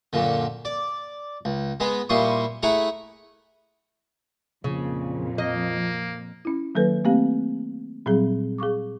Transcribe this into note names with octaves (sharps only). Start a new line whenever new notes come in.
F#2 A#2 D3
D5
C#2
G#3 B3 G#4
A#2 G3 E4 C6 C#6 D#6
A3 E4 G#4 F#5 A#5
F2 A#2 C#3 F3
A#3 D#5
C#4 E4
D#3 F#3 A#3 A4 B4
A3 A#3 C4 G4 F5
A#2 F#3 G3 C4 G#4
G#4 F5 C#6 D6